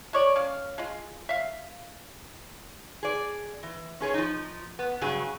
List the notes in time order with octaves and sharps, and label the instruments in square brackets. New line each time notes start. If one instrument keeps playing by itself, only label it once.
[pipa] G#3 C#5 D5
C#4 F5
G#3 F4
E5 F5
[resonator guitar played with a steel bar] G#4 D5
E3
C#4 G#4 B4 C#5
F3 D#4
B3
G2 C#3 F#3 G#4